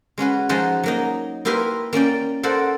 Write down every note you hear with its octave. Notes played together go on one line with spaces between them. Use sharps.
G#3 C#4 F#4 B4
F3 G#3 D#4 F#4
F#3 A#3 D#4
A#3 E4 G4 A#4 B4 C6
A#3 C#4 D5 G5
A4 A#4 C5 D5 F#5